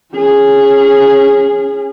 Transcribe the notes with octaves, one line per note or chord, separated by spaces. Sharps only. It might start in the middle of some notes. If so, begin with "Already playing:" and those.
C#4 G#4